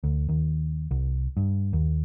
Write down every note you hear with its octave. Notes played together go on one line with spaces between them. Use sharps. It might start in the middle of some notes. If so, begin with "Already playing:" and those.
D2
D#2
C2
G2
D#2